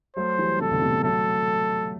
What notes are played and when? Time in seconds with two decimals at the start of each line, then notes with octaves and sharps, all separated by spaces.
0.16 F#3 A3 C5
0.38 E3 G3
0.60 C3 E3 A4
0.71 B2 D3
0.82 A2 C3
1.04 F#3 A3 A4